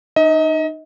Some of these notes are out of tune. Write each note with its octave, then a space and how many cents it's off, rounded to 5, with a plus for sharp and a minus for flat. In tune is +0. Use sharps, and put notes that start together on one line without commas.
D#4 -25 D#5 +30